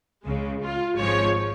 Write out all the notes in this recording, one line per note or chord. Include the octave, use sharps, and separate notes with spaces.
C#2 C#3 G#3
F4
G#1 G#2 F3 G#3 C#5